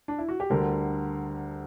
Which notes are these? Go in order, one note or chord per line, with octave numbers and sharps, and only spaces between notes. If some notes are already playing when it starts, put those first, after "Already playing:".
D4
E4
F#4
G4
D2 D3 G3 A#4